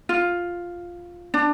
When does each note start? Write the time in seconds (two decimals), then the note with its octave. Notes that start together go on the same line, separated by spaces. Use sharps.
0.09 F4
1.34 D4